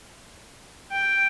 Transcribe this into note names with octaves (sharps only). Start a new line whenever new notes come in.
G5